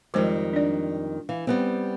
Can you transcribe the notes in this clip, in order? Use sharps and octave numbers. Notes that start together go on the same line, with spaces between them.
F2 D#3 F3 G3 G#3 C5
D4 D5
E3 F5
G3 B3 C4